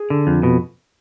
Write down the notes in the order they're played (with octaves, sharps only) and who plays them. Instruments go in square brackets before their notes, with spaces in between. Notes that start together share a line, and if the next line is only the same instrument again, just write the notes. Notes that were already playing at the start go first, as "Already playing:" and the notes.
Already playing: [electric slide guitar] G#4
D3
F2
B2